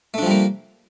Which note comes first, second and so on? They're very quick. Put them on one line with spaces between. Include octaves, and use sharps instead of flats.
A3 D4 F3 G3 A#3